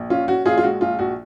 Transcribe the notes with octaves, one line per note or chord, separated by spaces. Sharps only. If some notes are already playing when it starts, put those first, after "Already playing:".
Already playing: A#1
C#4 F4
C#4 F#4
A#1 F4 G#4
F4
G#3 F#4
A#1 F4
A#1 F#4